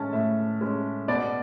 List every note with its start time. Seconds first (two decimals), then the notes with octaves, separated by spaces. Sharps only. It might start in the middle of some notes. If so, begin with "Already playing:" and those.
Already playing: A2 G#3 C#4 A5
0.13 A2 E5
0.61 G#3 C#4
1.08 B2 D5